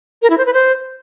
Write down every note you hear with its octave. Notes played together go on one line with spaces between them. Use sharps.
A#4
E4
C5
B4
C5